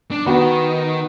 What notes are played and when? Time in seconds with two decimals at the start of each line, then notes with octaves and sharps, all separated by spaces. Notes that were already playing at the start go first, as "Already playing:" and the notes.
0.11 D4
0.26 D#3 B3 F#4